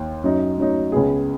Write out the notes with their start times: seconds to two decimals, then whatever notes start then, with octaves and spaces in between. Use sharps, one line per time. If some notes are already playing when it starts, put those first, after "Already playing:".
Already playing: D#2
0.24 F#2 F#3 D#4
0.58 F#2 F#3 D#4
0.92 C#2 C#3 B3 G#4